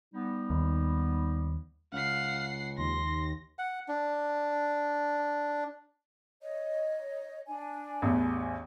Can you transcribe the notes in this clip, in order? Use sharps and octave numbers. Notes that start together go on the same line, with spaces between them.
G3 B3 D#4
D#2
C#2 F5 F#5 C7
D#2 C6 A#6
F#5
D4
C#5 D#5
D4 G#5
A1 E2